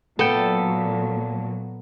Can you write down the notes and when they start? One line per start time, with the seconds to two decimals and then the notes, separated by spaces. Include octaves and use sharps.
0.19 A#2 F#3 B3 A4 G5